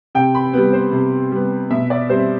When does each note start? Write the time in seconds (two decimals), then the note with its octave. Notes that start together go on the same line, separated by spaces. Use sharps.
0.15 C3 G5
0.35 B5
0.53 G3 B3
0.73 C5
0.92 C3
1.31 G3 B3
1.71 B2 E5
1.90 D5
2.09 G3 C4 C5